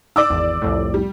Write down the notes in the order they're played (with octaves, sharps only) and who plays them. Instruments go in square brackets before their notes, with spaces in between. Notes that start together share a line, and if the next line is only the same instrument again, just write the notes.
[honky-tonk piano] D5 D6 E6
[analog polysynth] G#1 E2
C2 F2 A2
[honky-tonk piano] G3